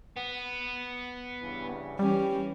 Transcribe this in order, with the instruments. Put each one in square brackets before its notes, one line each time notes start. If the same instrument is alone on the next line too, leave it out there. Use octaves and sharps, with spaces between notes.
[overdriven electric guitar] B3
[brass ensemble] G2 C#3 E3
[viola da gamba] E3 C#4 [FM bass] G3 [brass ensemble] G4